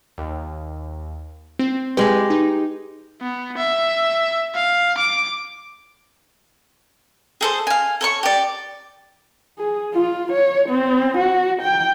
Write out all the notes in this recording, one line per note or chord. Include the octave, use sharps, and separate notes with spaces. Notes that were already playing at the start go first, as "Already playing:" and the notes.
D#2
C4
G#3 G4 B4
D#4
B3
E5
F5
D6
G#4 A4 C5
F5 G#5
A4 C#5 C#6
G4 D5
G#4
F4
C#5
C4
F#4
G5